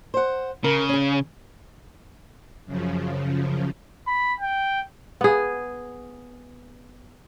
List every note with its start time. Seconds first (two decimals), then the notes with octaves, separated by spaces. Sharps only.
0.14 C5 F#5
0.64 C#3 A#4
0.89 C#4 G#4
2.66 F#2 C#3 F3
4.07 B5
4.40 G5
5.21 B3 G#4